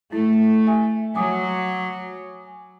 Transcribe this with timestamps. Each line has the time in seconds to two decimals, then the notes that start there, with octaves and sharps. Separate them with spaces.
0.12 A3 E4
0.67 E5 G#5
1.15 F#3 G#5 D6 D#6